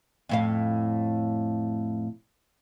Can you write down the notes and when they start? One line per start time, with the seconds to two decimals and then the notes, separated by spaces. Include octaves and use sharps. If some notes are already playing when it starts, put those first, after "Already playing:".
0.29 F2 A2 F5